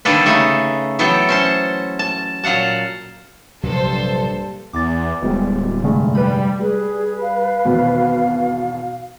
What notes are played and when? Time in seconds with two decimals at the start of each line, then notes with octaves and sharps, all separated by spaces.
0.05 D3 D#3 G3 A#3 A4 B4
0.26 C#3 A3 D#4
0.99 E3 F#3 B3 A4 G5
1.29 C#4 C5 A5
1.99 A5
2.43 A#2 F#3 F5 F#5 A5
3.63 A#1 G2 C3 F#3 A4 C5
4.73 E2 D6 A6
5.22 D1 G3 G#3 B3
5.84 F1 G2 D3 G#3 A3
6.15 G3 B4 B5
6.59 G3 G#4 B4
7.21 F5
7.65 G#1 E2 B2